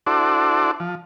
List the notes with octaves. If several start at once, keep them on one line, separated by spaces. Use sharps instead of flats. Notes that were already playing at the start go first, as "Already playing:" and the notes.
D4 E4 F#4 A4 C5 D5
F3